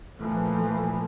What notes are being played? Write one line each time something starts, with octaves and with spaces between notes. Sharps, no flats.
A#2 E3 F3 A3 A#3